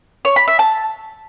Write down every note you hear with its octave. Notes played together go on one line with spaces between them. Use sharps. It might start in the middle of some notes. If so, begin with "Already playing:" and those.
C#5
B5
E5
A5